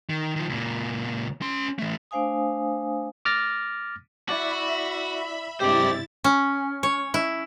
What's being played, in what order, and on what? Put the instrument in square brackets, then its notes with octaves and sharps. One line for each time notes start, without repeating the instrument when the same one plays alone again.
[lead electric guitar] D#3
D#3 F3
C#2 A#2
C#4 C6
E3 A3
[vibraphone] A3 D4 C5 F5 G#5 D#6
[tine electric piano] D6 F6 A6 A#6
[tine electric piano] E4 D5 D6 [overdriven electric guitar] F#4 [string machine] E5 B5
[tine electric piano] G2 C3 G#3 [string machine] E4 A6 [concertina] G4 [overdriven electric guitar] C5 D5
[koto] C#4
C#5
E4